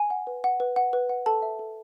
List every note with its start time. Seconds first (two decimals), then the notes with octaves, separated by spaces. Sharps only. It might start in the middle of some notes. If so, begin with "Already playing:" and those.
Already playing: G#5
0.10 F#5
0.27 B4
0.44 F#5
0.60 B4
0.76 F#5
0.93 B4
1.09 F#5
1.26 A4 A5
1.42 E5
1.59 A4